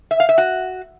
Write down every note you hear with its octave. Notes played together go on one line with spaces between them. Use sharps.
E5
F5
E5
F#4